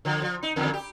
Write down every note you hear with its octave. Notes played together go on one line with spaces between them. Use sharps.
D3 F3
F3
D#4
E2 D3 D#3
G4